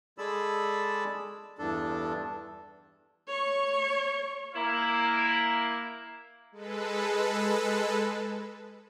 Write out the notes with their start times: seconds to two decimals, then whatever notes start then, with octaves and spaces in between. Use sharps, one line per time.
0.18 G#3 G#4 A4 D5 B5 E6
1.59 E2 G2 D4 A4
3.28 C#5 C#6
4.54 A#3 E4
6.52 G#3 A4 B4